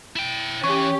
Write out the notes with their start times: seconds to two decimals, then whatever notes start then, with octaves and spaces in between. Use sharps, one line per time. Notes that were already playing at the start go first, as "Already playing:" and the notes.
0.16 E4 G5
0.64 E3 C#4 G4 C#6